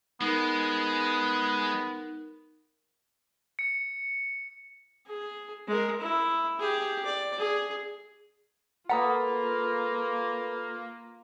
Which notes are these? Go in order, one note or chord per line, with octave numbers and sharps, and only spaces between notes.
G#3 B3 D#4 A#4
C#7
G#4
G#3 A#4
E4
G4 G#4
D5
G#4
A#3 F4 A4 B4 F#5 A#5 B5 D#6